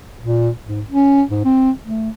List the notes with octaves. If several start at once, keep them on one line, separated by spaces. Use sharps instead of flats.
A#2
G#2
C#4
G#2
C4
A3